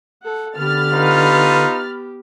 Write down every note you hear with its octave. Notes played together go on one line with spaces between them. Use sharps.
A4 F#5
D3 B3 G4 B5 F6 A6
D#4 F4 B4